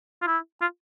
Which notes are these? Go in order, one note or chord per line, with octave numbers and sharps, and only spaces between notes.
F4
E4
F4